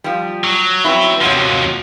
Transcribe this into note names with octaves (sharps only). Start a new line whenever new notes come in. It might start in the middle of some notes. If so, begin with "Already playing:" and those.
F3 G3
F#3
B3 C4 E4
D#2 C3 F3 F#3 F#4